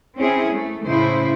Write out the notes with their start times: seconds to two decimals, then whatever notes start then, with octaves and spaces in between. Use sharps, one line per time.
0.17 C4 C#4 E4 G#4
0.51 A3
0.86 A2 C#3 E4 C5